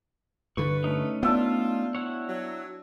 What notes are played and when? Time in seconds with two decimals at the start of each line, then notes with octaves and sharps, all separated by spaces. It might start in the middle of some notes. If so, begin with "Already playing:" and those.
0.57 G2 D3 B4 C#6
0.84 A3 C#4 D#4
1.23 B3 D4 F4 E5 G5
1.95 E4 F#4 C#5
2.28 F#3